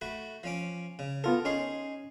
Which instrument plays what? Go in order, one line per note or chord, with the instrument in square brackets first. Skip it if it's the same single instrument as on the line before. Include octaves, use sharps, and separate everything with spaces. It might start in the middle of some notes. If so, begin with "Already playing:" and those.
[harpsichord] A3 F#4 B5
F3 C#4 D6
C#3
[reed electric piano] B3 F4 A4 [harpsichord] A#4
[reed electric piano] C#4 [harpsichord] D#4 G#4 C6